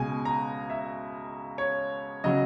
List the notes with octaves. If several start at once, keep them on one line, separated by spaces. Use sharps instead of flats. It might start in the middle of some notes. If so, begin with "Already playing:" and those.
Already playing: C#2 B2 G#3 G#5
A#5
E5
C#5
C#3 F#3 D#5